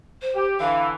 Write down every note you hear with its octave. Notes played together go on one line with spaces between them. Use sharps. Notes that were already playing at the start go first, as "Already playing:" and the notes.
C5
G4
D3 E3 F5